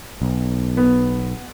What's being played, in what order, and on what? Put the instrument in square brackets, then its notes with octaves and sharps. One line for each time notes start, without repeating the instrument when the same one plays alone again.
[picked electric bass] B1
[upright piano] B3